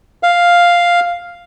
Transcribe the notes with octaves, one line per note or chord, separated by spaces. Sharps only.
F5